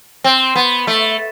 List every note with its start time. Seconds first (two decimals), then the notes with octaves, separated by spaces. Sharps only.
0.24 C4
0.55 B3
0.87 A3